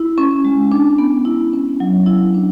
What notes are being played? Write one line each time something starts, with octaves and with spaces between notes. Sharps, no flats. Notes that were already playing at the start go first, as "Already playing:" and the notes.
Already playing: E4
C#4
G#3
D4
B3
E4
C#4
F#3
E4
D4